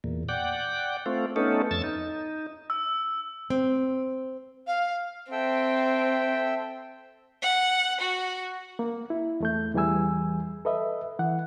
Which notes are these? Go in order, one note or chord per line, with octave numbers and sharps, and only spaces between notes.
E2 A#2
D5 F#5 G5
A3 C4 F4
A3 B3 C#4 D#4 A4
F2 E6 A6
D#4
E6
C4
F5
C4 A4 E5 G5
F#5
F#4
A#3
E4
E2 A3 G6
E2 E3 G3 G#4 G#5 E6
A4 B4 D#5 E5
E3 F#5